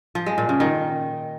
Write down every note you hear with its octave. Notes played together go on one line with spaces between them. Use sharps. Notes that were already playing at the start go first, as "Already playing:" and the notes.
F3
G#3
A#2
C#3
D#3